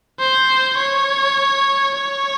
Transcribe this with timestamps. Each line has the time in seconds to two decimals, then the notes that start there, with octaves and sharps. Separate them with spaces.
0.20 C5
0.78 C#5
1.96 C#5